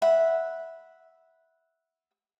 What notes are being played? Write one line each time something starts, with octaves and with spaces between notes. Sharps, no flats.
E5 F#5 B5